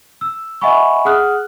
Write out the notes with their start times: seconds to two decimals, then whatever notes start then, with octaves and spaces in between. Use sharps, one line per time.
0.21 E6
0.61 D#5 E5 F#5 G#5 B5 C#6
1.05 G#4 F#5 D#6 F6 F#6